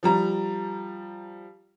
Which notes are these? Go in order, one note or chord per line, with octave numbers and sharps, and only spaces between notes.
F3 G3 A#5